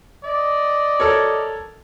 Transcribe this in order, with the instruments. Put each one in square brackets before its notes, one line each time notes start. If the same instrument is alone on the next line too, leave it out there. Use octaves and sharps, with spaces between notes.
[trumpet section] D5 D#5
[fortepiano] A4 A#4 C#5